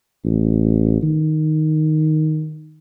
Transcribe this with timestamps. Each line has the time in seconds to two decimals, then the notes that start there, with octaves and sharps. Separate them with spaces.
0.24 A1
1.03 D#3